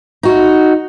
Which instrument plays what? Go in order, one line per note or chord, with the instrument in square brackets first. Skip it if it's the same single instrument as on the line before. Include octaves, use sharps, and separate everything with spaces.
[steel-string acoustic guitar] D#4 F#4